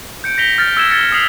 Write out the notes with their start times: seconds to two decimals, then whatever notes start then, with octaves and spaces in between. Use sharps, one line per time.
0.24 G6 C#7 D7
0.38 A#6 B6 F7 G7
0.58 F6 G6 A6
0.77 E6 G#6 E7
0.90 G#6 A6 C#7 G7
1.12 D#6 F6 B6 C7 F7 F#7